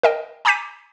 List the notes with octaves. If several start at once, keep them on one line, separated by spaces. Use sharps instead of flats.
A#4 D#5 G5
G#5 A#5 D6 G6 B6 D#7